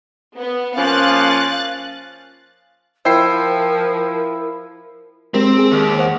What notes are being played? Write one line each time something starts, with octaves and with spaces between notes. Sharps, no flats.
B3
F3 A#3 C#4 F5 G#5 F#6 A6
F3 E4 A#4 C5 G5 C7
G#3 C4 G4 A#4
G#4
D#2
C5 F#5